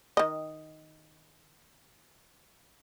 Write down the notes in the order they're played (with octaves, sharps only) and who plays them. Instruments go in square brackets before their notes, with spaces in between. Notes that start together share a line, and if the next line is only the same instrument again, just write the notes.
[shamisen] D#3 D#5